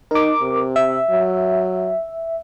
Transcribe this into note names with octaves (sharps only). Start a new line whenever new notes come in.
D#4 A#4 D6
C3
E5
F#3